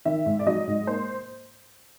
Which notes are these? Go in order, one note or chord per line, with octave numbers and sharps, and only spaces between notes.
D#3 E5
G#2
D5
F#3 D#5
G#2
A#3 C5